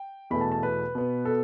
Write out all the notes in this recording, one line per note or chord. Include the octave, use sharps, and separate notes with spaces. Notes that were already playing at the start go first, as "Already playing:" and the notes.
Already playing: G5
E2 B2 A3 B5
A5
A5
B4
B2 B3
A4